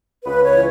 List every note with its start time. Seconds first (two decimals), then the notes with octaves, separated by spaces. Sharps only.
0.24 C#2 B4
0.44 C#5
0.52 E3